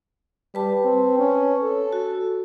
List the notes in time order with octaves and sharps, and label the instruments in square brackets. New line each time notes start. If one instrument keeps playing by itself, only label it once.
[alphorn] G3 [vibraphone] B4 A5
[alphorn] C4
C#4
A4
[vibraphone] F#4